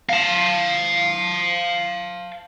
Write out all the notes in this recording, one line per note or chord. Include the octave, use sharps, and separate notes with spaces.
F5 A5